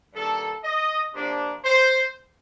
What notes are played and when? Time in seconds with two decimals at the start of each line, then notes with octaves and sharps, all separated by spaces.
0.13 G2 D#3 A#3 D4 A4
0.63 D#5
1.14 C3 F3 A#3 D4
1.64 C5